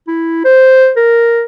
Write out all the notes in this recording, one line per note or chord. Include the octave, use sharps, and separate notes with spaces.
E4
C5
A#4